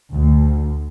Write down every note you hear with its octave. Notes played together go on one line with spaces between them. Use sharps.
D2